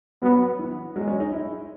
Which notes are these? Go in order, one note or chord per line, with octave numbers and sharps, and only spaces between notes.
F#3 B3
E3
F#3 G#3
C#4
D#4
E4